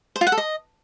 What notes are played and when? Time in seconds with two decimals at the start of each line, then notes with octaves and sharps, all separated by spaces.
0.16 C5
0.21 F4
0.27 F#5
0.32 A4
0.37 D#5